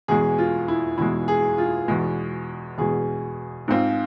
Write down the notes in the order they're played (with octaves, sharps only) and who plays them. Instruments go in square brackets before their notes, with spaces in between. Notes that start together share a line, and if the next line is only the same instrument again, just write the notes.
[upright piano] E2 B2 G#3 [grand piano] G#4
[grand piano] F4
E4
[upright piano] E2 B2 G#3 [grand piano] E4
[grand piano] G#4
F4
[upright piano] E2 B2 G#3
[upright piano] E2 B2 G#3 [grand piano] G#4
[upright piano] G#2 G#3 C4 F4